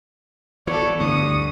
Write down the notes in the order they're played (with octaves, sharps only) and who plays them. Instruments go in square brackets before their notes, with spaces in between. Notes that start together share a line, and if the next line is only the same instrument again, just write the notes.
[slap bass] E3 [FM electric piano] B3 [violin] A4 D5 [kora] C#5
[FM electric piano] D2 C#6 C#7 [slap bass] G2 [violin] D#6 D#7